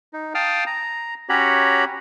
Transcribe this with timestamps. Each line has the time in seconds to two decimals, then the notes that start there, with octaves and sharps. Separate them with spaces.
0.13 D#4
0.35 F5 G5 A5 D#6 F6
0.67 A#5
1.29 C#4 F#4 G4 C#5 A#5 B5